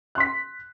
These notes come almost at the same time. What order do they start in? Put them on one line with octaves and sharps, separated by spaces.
F#6 C6 B6